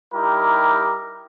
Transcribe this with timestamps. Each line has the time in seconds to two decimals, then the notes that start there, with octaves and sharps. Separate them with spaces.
0.14 G3 D#4 E4 G4 A#4